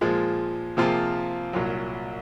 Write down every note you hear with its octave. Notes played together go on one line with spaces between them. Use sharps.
A#2 F3 G#3
C3 F3 A#3 F4 G#4
C2 A#2 F#3